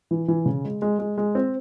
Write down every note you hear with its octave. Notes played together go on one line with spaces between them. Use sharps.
E3
E3
C#3
G#3
G#3
G#3
G#3
C4